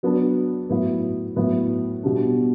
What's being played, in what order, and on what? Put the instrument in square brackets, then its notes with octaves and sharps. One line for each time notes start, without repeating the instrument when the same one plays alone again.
[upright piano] F#3 B3 D4
A2 F#3 B3 E4
A2 F#3 B3 E4
B2 G3 D4